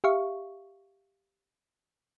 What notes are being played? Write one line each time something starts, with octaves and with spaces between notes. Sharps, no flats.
G4 E5 F5 C#6